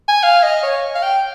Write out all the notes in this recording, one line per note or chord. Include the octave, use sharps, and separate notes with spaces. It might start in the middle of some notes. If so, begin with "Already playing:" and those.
G#5
F5
D#5
C#5
F5
G5